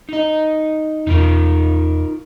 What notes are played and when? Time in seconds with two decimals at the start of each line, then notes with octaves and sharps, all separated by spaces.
0.09 D#4 D#5
1.07 E1 D#4 F4 A#4